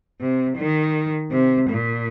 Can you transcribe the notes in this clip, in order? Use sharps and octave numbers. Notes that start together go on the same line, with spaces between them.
C3
D#3
C3
A#2